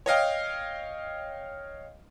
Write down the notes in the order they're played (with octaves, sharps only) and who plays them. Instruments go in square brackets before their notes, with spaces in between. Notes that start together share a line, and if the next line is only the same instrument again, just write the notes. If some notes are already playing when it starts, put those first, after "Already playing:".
[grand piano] C#5 D#5 F5 G5